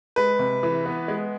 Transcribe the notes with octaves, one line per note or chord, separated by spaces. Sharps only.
G#3 B4
C3
E3
B3
G#3